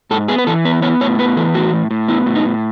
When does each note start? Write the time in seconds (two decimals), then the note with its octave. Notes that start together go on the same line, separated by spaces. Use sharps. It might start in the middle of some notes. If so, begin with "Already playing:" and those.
0.11 G#2 A4
0.28 B3 G#4
0.38 B4
0.47 E3 A4
0.65 B3 B4
0.82 B3 C#5
1.01 A2 C#5
1.19 B3 B4
1.37 E3 A4
1.54 A2 F#4
1.73 A2
1.91 A2
2.08 B3 E4
2.26 A2
2.35 D#4
2.45 A2